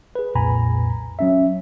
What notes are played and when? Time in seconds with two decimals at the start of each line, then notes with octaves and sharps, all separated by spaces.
0.15 G#4 B4
0.35 B1 F2 A#2 G#5 A#5 B5
1.19 F#3 C#4 E5